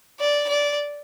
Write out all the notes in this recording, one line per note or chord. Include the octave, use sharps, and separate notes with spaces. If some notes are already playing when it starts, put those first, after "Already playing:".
D5
D5